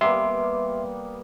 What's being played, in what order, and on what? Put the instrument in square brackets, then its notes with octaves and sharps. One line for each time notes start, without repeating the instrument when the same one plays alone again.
[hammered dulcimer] G3 A#3 B3 [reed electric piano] E5 C6